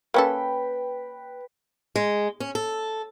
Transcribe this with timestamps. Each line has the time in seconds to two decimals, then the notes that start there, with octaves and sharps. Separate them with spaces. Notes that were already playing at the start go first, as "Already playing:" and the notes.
0.14 A#3 C#4 A4 B4 G5
1.96 G#3
2.40 C#4
2.55 A4